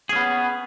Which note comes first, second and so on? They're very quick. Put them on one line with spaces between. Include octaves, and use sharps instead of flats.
G#4 C#4 B3